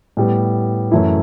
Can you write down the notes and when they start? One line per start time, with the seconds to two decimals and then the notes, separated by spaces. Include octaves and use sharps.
0.17 A2 G3 B3
0.91 F#2 E3 A3 E4